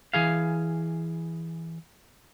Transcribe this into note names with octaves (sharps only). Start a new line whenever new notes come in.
E3 G#4 F5